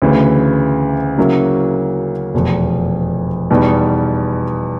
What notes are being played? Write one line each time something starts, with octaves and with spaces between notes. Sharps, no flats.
D2 C#3 E3
C#3 F#3 A#3 C#4 E4
F1 E2 B2
E2 B2 G3 B3 D#4